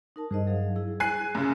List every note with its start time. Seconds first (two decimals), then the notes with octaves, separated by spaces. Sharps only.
0.16 D#4 A#4 A5
0.31 G2 G#4 C5 D#5
0.47 F#3 G#4 F5
0.76 E4 G#4
1.00 G#5 F#6 C7
1.35 F#2 C#3